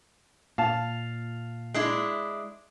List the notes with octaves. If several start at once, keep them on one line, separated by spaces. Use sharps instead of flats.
A#2 F5 A5
G#3 D4 E4